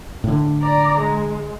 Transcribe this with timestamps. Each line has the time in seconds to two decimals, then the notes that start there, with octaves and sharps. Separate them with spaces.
0.24 A2 D3
0.62 D5 A#5
0.99 G#3